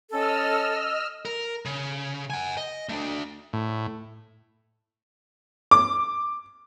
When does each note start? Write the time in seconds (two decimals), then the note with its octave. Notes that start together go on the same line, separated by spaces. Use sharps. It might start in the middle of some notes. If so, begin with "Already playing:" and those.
0.12 C#4 A4 D#5 E6 F6
1.25 A#4
1.65 C#3
2.30 F#5 G#5
2.57 D#5
2.89 A3 D4
3.53 A2
5.71 D6